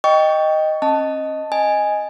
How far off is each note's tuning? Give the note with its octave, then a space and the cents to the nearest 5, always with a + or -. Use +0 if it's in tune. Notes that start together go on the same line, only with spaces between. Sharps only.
D#5 +0 G5 +0 C#6 +25
C#4 -45 D#5 +0 A5 +0
D#5 +0 G#5 -5